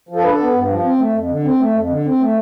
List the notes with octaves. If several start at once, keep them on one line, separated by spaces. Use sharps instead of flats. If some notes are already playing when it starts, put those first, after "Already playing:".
F3
A4
D4 B4
A4
B3
G2
F3
C4
A3
F2
D3
C4
A3
F2
D3
C4
A3